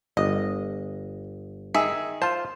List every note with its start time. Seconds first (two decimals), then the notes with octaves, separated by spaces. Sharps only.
0.17 G1 D#5
1.74 D#3 G#4 E5
2.22 F4 C5 A5